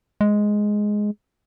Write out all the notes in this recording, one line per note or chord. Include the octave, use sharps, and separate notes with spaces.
G#3